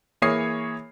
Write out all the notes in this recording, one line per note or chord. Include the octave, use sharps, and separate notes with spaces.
E3 A#3 G#4 C#5 D#6 C7